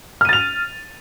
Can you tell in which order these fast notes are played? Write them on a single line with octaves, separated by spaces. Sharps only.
F6 D#7 A6 F7